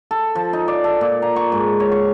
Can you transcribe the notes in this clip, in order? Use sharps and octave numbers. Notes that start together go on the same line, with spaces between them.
A4
F3
D#4
D5
A4
A#2
A#5
C#6
G#2
C#5
C#6